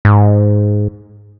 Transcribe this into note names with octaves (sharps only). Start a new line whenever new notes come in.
G#2